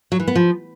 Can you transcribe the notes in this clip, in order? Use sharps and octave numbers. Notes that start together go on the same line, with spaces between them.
F#3
E3
B3
F3